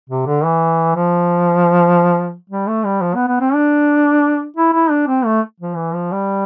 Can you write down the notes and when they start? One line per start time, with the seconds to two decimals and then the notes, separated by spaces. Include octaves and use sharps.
0.09 C3
0.26 D3
0.45 E3
0.96 F3
2.50 G3
2.67 A3
2.84 G3
3.01 F3
3.15 B3
3.28 B3
3.40 C4
3.54 D4
4.57 E4
4.74 E4
4.90 D4
5.08 C4
5.25 A3
5.60 F3
5.76 E3
5.94 F3
6.12 G3